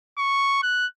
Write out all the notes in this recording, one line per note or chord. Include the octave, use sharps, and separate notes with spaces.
C#6
F#6